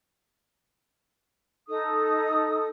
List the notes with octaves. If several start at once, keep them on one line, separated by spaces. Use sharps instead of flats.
D#4 A4 D#6